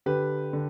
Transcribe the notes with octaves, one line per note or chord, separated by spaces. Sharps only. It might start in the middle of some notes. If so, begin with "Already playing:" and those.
D3 G4 B4
D3